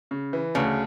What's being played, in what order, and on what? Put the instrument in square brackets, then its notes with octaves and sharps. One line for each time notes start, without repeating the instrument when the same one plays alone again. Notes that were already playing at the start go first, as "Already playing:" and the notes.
[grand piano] C#3
E3
[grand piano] D2 [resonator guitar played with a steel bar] C#3